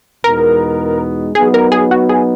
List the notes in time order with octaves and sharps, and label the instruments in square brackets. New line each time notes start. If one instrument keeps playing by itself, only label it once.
[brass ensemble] E2 B2 G#3 B3 D#4 [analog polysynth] A#4
[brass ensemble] F#3 B3 D#4 [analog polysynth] G#4
[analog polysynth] A#4
G#4
F#4
G#4